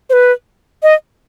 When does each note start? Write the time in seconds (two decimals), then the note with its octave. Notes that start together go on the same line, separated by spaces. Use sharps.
0.10 C5
0.13 B4
0.83 D#5